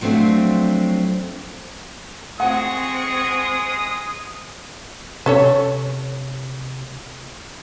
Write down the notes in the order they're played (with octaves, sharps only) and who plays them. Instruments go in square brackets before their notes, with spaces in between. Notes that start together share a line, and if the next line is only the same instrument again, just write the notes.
[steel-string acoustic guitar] F3 F#3 A3 C4 D4 F#4
[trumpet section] G#3 D#6 [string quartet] C4 C#6 [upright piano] F#5
[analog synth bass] C3 [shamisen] C#4 A4 C#5